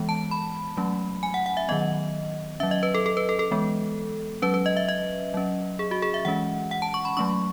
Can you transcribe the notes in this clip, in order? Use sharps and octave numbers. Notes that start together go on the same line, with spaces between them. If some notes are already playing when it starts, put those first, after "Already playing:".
Already playing: E3 G#3 B3
A5
B5
F#3 A3 C#4
G#5
F#5
F#5
E5
D#3 F#3 B3 D#5
F#3 C#4 E5
D#5
B4
A4
A4
B4
A4
A4
E3 G#3 B3
F#3 C#4 B4
B4
D#5
E5
D#5
F#3 C#4
G#4
F#4
G#4
E5
E3 G#3 C#4 F#5
F#5
A5
C#6
B5
F#3 A3 C#4 C#6